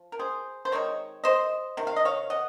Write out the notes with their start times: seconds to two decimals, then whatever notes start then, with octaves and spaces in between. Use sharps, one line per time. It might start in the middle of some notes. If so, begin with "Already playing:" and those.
Already playing: F3
0.12 A#4
0.19 G#4 C5
0.65 C5
0.72 D#3 G#3 C4 D#4 C#5
1.24 C5 D#5
1.77 C3 D#3
1.87 F5
1.96 D#5
2.05 C#5 F5
2.30 D#5 F#5